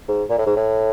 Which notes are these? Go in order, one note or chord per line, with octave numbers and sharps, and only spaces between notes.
G#2
A#2
A2
G#2
A2